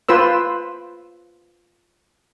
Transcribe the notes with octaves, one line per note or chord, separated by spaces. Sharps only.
F4 B4 C5 E6